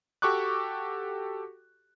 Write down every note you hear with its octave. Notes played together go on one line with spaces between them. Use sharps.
F#4 G4 A4 C#6 D6 F#6